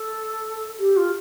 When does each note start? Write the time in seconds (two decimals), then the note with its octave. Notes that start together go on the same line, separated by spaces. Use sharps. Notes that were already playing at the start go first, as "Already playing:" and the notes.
Already playing: A4
0.79 G4
0.97 F4